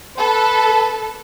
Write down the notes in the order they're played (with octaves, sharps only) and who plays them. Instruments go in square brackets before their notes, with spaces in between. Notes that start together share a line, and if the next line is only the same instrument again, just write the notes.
[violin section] A4 [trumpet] B4